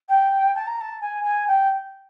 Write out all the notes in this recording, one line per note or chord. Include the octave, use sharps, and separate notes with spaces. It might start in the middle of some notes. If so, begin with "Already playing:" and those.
G5
A5
A#5
A5
G#5
G#5
G5